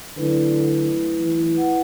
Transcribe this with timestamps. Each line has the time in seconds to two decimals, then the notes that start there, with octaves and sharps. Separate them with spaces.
0.17 D3 F#3 A3 E4 B4
1.19 E3
1.55 E4 B4 F#5